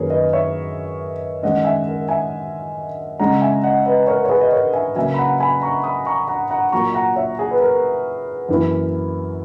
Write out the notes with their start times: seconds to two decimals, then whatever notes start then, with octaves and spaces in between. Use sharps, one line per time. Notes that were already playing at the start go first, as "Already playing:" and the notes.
Already playing: F#2 D#3 A#3 G#4 A#4 B4 C#5
0.10 B4 D#5
0.33 C#5 E5
1.43 D#3 G#3 C#4 D#5 F#5
1.65 E5 G#5
1.87 A#4
2.09 E5 G#5
3.19 C#3 G#3 C#4 F#5 A#5
3.41 E5 G#5
3.64 D#5 F#5
3.86 B4 D#5
4.07 A#4 C#5
4.25 C#5
4.29 G#4 B4
4.41 D#5
4.52 A#4 C#5
4.74 E5 G#5
4.95 C#3 F#3 A#3 E5 G#5
5.14 B5
5.18 F#5 A#5
5.40 G#5 B5
5.62 A#5 C#6
5.84 B5 D#6
6.06 A#5 C#6
6.28 F#5 A#5
6.50 F#5 A#5
6.72 A#2 F#3 A#3 A#5 C#6
6.94 F#5 A#5
7.16 C#5 E5
7.39 G#4
7.51 B4
7.61 A#4
8.49 F#2 E3 A#3 E4